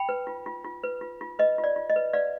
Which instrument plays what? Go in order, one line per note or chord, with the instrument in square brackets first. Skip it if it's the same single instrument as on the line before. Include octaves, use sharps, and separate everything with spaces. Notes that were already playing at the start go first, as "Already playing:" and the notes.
Already playing: [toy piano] G5 B5
B4
F4
F4
F4
B4
F4
F4
B4 D#5
F4
D5
F4
D#5
B4
B4 D5 F5